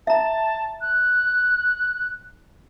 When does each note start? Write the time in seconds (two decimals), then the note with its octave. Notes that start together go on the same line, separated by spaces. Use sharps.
0.07 E5 A5 A#5
0.81 F#6